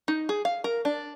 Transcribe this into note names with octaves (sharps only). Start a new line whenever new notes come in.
D#4
G#4
F5
A#4
D4